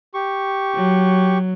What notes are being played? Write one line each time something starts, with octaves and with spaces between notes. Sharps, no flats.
G4 C#6
F#3